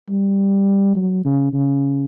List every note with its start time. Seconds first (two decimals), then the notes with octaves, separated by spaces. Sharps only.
0.09 G3
0.96 F#3
1.25 C#3
1.53 C#3